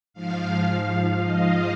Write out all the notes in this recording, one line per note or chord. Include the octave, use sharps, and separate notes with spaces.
G#2 F3 F5
F5
D#5